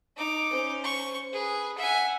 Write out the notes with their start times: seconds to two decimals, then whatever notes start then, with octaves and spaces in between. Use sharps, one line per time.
0.16 D#4 D6
0.50 C#4 C5
0.84 C#6
1.33 G#4 B4
1.78 E5 F#5 G#5